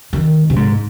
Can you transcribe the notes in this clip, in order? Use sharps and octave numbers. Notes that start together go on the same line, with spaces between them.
D#3
B2
G#2